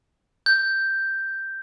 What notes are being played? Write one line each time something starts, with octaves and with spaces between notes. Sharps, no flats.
G6